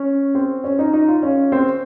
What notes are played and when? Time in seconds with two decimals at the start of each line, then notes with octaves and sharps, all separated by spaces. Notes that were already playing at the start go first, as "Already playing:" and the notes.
Already playing: C#4
0.35 C4
0.64 C#4
0.79 D#4
0.93 D#4
1.08 F4
1.23 C#4
1.52 C4